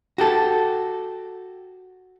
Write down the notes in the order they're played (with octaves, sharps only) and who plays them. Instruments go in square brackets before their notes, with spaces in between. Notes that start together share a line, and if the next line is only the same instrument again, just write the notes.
[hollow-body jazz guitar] F#4 G4 A4